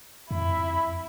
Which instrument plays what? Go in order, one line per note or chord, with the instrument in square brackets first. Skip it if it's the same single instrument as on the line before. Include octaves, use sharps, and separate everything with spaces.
[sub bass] F2 [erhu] E4